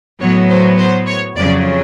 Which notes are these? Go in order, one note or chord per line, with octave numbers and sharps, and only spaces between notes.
A2 F#3 B3 C#5
C5
C5
C#5
F2 C#3 F#3 D5